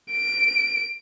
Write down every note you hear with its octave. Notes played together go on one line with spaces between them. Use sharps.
D7